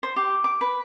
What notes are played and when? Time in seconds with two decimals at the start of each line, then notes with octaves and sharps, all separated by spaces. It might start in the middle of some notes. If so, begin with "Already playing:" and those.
0.03 C5
0.16 G4
0.44 D6
0.61 B4